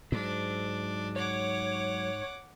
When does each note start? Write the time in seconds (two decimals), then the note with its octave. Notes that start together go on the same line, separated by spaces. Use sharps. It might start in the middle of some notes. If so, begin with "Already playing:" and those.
0.12 G#2 F#3 G#3 D4
1.16 C#5 F#5 D6